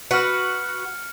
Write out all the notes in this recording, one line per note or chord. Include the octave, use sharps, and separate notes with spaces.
F#4 B4 F6 C#7